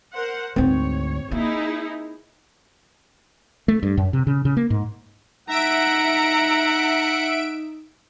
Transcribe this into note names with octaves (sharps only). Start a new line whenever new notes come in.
A#4 C5 F#5
D2 G#2 C4 C#5
A#3 D#4 E4 G#4
A3
G2
F#2
C3
C#3
C#3
A#3
G#2
D#4 E5 F#5 A#5 D7